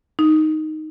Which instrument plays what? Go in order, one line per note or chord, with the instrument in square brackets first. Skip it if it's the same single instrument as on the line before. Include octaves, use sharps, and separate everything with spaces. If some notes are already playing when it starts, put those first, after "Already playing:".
[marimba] D#4